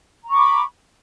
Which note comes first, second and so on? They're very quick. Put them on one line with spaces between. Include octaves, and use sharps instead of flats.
A#5 C#6 D6 B5